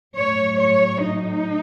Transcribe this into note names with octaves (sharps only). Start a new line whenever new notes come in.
A2 F#3 C#5
C#5
D#4